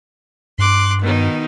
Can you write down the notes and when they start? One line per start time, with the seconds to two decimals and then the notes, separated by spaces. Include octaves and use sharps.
0.58 G2 C6 D6 F#6
1.01 B2 D#3 D#4